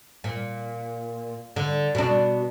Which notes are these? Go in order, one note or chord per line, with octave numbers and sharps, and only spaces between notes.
A#2
D3
B2 D4